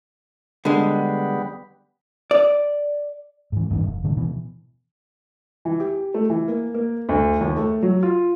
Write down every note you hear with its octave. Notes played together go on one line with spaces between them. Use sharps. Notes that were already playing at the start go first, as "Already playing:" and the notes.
D3 G3 G#3 B3
D5
G#2 E3
D#1 G#1 G2 E3
E1
A2 D3 D#3
B2 E3
E3
G4
A3
E3
A#3
A#3
D2
D#2
A3
F#3
F4